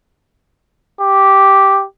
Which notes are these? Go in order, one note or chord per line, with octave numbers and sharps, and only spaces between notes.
G4